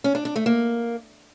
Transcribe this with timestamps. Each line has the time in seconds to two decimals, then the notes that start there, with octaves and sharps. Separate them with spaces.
0.04 C#4
0.15 D4
0.25 D4
0.36 A3
0.46 A#3